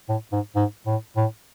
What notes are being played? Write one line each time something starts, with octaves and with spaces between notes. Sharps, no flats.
A2
G#2
G#2
A2
A2